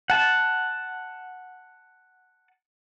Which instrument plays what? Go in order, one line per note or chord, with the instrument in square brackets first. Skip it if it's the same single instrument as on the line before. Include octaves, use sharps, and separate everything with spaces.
[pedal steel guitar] F#5 A5